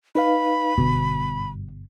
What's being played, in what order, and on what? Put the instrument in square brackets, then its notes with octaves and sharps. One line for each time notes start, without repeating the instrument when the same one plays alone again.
[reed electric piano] D#4 B4 F5 [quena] B5
[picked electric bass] G1 B2 [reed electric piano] G2